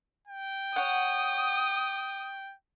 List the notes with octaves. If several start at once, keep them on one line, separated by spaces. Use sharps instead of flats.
G5
C#5 F#5 D#6